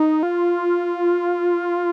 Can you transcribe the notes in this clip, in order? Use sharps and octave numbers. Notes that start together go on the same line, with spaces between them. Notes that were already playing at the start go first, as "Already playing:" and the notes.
Already playing: D#4
F4